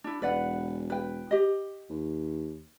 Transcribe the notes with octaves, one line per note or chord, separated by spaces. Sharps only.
D4 E4
E1 B4 D5 F#5
B4 G5
G4 D#5
D#2